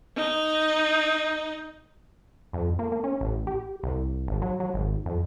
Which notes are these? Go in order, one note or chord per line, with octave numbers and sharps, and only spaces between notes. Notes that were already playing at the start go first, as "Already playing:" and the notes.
D#4
F2
A#3
A#3
C#4
A1
G4
C2
G#1
F#3
F#3
G#1
F2